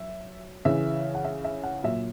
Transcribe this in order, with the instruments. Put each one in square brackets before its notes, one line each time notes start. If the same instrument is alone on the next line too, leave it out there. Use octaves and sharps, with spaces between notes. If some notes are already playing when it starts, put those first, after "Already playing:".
Already playing: [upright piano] F#3 E5
C#3 E3 E5
F#5
E5
E5
F#5
A#2 F#3 E5